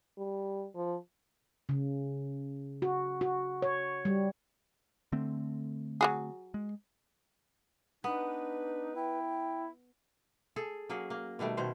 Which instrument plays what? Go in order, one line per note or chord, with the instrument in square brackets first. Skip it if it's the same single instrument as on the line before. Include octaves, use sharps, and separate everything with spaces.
[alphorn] G3
F3
[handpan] C#3
F#4
F#4
C#5
G3
[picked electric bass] D3 A3 C4
[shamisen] F#3 F#4 G#4
[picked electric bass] G#3
[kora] B3 [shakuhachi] D4 [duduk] D#4 [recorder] B4
[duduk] E4 [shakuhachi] G5
[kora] G#4 A4
F#3 A#3 C#4 G#4
A#3
B2 D#3 G3 A3
B2 D#3 C#4 C5